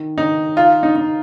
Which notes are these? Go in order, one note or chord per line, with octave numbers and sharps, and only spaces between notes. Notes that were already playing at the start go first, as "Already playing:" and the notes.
Already playing: D#3
D#3 D#4
D#4 F4
D#4
D#4